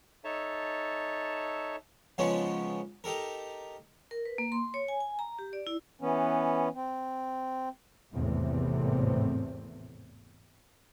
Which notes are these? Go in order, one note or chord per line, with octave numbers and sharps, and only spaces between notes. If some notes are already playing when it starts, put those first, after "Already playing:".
D#4 A4 C#5 E5 A5
C#3 F3 G#3 B3 C#4 D#4
D#4 G4 A4 A#4
A#4
B4
A#3
C6
C#5
G#5
G#5
A#5
G4
D5
E4
E3 B3 C#4
C4
G#1 E2 A2 C3 A3 C4